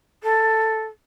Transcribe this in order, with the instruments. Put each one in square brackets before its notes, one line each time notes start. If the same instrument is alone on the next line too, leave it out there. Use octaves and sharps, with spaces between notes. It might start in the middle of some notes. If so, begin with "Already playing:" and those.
[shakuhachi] A4